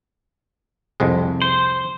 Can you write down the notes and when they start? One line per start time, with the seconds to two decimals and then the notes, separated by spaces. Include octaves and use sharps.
1.00 C2 F2 G#3
1.42 C5